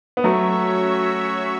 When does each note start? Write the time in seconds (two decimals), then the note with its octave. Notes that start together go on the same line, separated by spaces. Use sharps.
0.17 B3
0.23 F#3 A3 C#4 F#4 C#5 E5